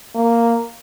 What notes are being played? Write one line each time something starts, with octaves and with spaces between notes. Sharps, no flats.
A#3